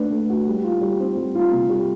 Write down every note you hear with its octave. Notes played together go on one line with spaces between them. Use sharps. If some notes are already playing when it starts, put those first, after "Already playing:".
Already playing: A3 D4 B4
A3
F#4
G3
F4
G3
C4
G3
F4
C3
G3